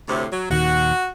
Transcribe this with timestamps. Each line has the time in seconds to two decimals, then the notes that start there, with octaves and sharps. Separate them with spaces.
0.08 D2 A2 C3
0.32 F#3
0.50 D#1 D#2 D#3 F#4